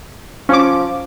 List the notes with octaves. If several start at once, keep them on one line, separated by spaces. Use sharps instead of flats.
F3 C#4 D6